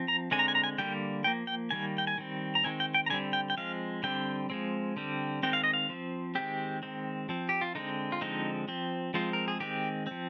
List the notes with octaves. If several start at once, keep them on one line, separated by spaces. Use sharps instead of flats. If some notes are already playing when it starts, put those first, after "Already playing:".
Already playing: F3 C4
A#5
D3 G#3 C4 G#5
A#5
G#5
A#5
G#5
D3 G3 A#3 G5
F3 A#3 G5
G5
D#3 G3 A#3 G#5
G5
G#5
D#3 G3 C4
A#5
D#3 G#3 C4 G#5
G5
G5
A#5
D3 G3 C4 G#5
G5
G5
F3 G#3 C4 F5
D3 G3 C4 G5
F3 G#3 C4
D3 G3 C4
D#3 G#3 C4 G5
F5
D#5
F5
F3 C4
D#3 G#3 C4 G4
D#3 G#3 C4
F3 C4
G4
F4
D3 G#3 C4 D#4
F4
D3 F3 G#3 C4 D#4
F3 C4
F3 G#3 C4 F4
A#4
G#4
D#3 G#3 C4 G4
F3 C4